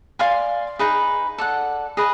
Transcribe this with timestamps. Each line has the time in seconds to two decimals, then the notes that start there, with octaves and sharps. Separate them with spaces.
0.19 D5 F5 G#5 C6
0.79 D#4 G#4 B4
1.38 A4 D5 F#5
1.97 G#4 B4 D#5